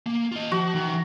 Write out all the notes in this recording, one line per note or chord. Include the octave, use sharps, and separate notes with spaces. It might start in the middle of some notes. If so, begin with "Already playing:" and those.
A#3
F4 D#5
F3 F#4
E3 D#4